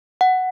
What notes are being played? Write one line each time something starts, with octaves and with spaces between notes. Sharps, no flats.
F#5